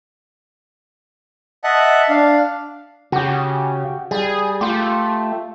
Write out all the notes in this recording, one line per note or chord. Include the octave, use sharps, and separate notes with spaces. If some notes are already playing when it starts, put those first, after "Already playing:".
D#5 E5 F#5 A5 F#6
D4 F5
C#3 F#4 G4
G3 G#4
A3 F4 G4